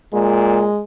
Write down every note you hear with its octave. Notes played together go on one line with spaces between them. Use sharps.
A#2 G#3